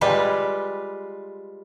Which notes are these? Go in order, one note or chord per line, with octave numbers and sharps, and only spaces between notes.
G3 G#3 F4 B4